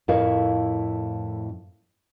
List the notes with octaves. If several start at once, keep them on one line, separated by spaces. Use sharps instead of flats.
F2 A2 E4 A#4 C#5 F5